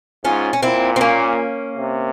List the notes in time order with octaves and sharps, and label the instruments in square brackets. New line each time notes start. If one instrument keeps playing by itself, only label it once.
[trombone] G#2 [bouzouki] C#4 F4
[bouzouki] C#4
[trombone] A#2 [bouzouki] C4 E4
[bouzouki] C4
A#3 C#4
[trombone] C3